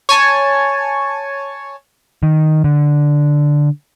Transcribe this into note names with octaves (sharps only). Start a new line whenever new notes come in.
C#5 G#5 A5 C#6
D#3
D3